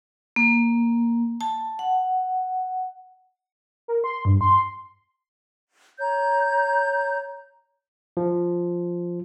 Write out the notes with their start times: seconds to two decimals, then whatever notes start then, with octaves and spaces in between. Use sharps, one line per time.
0.36 A#3
1.41 A5
1.79 F#5
3.88 A#4
4.04 C6
4.25 G2
4.41 C6
5.99 C#5 A#5 G6
8.17 F3